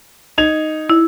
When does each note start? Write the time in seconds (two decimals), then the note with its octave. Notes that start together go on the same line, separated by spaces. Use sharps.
0.38 D#4 G#6 F7
0.90 E4